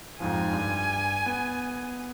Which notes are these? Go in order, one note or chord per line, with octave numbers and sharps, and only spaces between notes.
F2 G#2 F3 G#5
G2
B3